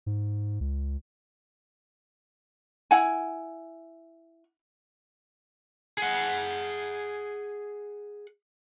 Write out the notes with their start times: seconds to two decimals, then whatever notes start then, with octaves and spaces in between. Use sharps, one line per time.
0.06 G#2
0.61 C#2
2.91 E4 F#5 G#5
5.98 G#4 F#5